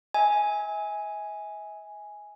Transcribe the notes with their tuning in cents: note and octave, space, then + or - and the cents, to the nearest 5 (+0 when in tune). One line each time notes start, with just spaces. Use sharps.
E5 -40 G#5 +0